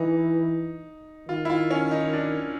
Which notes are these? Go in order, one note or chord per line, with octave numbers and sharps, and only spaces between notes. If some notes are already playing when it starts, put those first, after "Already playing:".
Already playing: E3 D#4
D#3 F4
E4
F4
C#4
D#4
D4